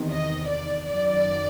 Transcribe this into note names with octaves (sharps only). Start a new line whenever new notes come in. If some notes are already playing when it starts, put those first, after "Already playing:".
Already playing: E2 C3 D#3
D#5
D5
F#2 D#3 F#3 D5